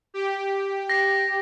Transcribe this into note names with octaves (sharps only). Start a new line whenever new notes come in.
G4
A#6 C7